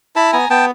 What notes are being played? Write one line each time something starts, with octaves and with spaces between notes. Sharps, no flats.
E4 A5 B5
B3 G#5 A#5
B3 G5 A5